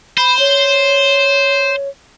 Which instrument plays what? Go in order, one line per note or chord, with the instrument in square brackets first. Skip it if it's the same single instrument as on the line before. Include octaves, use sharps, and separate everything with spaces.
[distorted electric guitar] C5 [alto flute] B5
[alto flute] C#5